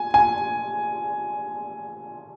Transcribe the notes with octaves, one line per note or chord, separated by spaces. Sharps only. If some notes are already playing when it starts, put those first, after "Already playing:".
Already playing: G#5
G#5